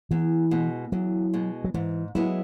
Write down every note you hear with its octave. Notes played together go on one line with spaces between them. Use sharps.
E2 E3
B2 G#3
E2 F#3
B2 G#3
F#3
G#2 E3
F#3 G#3 B3 E4